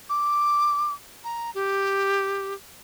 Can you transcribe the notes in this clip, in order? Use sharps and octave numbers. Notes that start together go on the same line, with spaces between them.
D6
A#5
G4